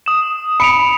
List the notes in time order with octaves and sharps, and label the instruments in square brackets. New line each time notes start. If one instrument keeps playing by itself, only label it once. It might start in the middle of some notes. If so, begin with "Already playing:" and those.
[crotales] D#6 E7
[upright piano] B5 [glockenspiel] C#7 D7 F7